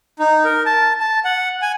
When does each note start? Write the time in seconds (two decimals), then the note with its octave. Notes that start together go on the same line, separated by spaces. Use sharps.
0.19 D#4
0.45 A#4
0.66 A5
1.00 A5
1.25 F#5
1.62 G#5